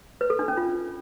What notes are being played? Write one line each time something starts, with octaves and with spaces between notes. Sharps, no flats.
B4
A4
D4
C#4
F4